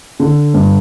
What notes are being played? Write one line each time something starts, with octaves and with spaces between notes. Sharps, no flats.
D3
G2